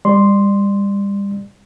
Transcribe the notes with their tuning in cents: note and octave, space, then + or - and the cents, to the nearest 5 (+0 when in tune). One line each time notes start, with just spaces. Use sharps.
G3 +30 D5 +20 C6 +0